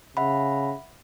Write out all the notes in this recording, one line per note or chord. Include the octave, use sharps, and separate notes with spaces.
C#3 E5 F#5 B5